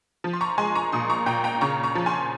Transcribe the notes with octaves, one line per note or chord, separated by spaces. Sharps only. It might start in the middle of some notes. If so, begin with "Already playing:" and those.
F3
C6
A#5 C#6
G#3 G#5 C6
A#5 C#6
A#2 C6 D#6
A#5 C#6
A#2 G5 A#5
G5 A#5
C#3 A#5 C#6
A#5 C#6
F3
G#5 C6